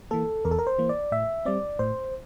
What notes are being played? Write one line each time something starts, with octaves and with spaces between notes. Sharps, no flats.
E3 A#3 A4
E2 A#4
A4
A#4
C5
E3 A#3
D5
A2 E5
G3 C4 D5
A2 C5